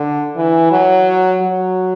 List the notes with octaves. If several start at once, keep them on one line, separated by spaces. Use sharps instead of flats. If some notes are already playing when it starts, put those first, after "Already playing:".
Already playing: D3
E3
F#3
F#3